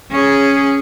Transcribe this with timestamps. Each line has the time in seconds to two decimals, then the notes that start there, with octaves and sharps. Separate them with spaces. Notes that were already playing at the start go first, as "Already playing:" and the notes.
0.12 C#4 G#4